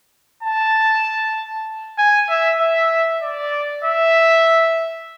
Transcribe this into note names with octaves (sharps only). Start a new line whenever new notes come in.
A5
G#5
E5
E5
D5
E5